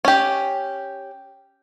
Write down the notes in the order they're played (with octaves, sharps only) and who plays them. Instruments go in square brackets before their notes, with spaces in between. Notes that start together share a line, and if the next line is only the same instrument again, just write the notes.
[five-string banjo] C#4 G4